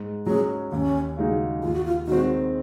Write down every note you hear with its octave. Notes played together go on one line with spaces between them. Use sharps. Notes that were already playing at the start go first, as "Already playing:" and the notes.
Already playing: G#2
F#3 C#4 G#4
D#2 C#4
C#3 G#3 D#4 F#4
D#2 F4
F#4
F4
D#3 G#3 C4 F#4